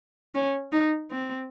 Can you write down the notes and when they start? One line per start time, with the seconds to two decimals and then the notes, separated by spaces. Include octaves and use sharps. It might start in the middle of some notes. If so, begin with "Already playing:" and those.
0.35 C#4
0.72 D#4
1.11 C4